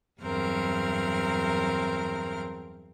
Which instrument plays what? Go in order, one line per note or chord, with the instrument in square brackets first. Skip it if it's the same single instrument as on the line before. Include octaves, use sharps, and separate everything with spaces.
[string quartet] E2 G2 F#3 C4 A#4 F6